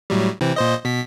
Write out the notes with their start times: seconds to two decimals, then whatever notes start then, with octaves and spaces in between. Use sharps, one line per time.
0.10 A2 F#3 G3
0.41 C3 E3 C4
0.56 A#2 C5 D#5
0.85 B2 B6